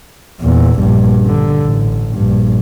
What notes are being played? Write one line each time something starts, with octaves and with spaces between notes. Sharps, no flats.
E2 A#2
A#1 G2
D3
A1
A#1 G2